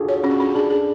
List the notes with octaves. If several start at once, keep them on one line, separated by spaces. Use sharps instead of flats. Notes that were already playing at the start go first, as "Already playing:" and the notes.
Already playing: D4 F4 F#4 G#4 A4
C#5
C#4 F#4
C#4
D4 G#4
G#4